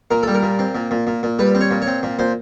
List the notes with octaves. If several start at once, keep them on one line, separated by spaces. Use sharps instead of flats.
A#2 A#4
G3 A4
A#4
A#2
C4
A#2
A#2
A#2
A#2
G3 B4
C4
C#5
A#2
C#5
C4
A#2
A#2 C5